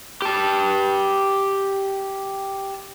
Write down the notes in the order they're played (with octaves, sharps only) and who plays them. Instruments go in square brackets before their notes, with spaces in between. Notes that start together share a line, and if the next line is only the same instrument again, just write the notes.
[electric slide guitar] G4 A5